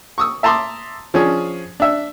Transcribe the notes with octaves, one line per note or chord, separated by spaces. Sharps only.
C#6 D#6 E6
E5 A5 A#5 C6 D6 D#6
F3 C#4 D4 G#4
D4 E5